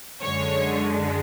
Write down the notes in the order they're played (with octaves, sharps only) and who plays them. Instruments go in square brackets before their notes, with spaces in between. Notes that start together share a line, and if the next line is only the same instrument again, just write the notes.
[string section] F#2 D3 G#3 C#5